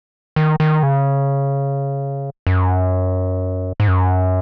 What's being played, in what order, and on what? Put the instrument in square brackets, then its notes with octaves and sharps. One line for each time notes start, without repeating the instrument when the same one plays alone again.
[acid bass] D#3
D#3
C#3
F#2
G#2
F#2